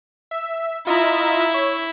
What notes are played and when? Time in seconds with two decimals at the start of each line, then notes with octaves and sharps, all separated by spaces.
0.31 E5
0.87 E4 F4 D#5 E5 A#5
1.54 C#5